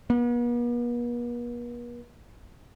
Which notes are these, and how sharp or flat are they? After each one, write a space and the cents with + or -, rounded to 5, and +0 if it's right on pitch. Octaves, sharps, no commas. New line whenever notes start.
B3 -45